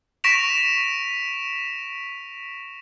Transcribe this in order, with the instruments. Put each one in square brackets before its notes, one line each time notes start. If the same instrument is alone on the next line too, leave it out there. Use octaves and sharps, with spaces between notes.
[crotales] C#6 A#6 B6 D7 E7 F7